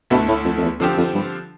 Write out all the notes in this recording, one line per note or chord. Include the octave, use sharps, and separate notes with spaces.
D2 B2 D3 A3 E4 A4
A2
F2
F2
E2
F2 D3 F3 C4 G4
F2
G2